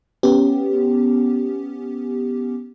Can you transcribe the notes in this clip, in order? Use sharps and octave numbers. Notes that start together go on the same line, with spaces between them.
B3 C#4 G4